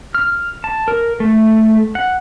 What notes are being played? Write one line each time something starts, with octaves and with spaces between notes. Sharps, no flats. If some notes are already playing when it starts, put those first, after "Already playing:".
F6
A5
A#4
A3
F#5